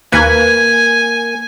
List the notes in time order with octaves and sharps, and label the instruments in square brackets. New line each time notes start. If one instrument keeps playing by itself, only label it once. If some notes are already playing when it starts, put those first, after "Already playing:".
[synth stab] D#2 B4 G#6 [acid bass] A#3 [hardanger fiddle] G#5